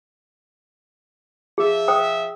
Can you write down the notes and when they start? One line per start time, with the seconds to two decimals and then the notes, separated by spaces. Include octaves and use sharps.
1.58 F3 G#4 E5
1.88 C5 G5 D#6